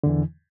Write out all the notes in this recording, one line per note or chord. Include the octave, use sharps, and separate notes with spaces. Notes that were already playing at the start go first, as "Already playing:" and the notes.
E2 D3 E3